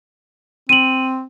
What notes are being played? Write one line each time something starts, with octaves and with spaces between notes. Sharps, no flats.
C4 D#7 F#7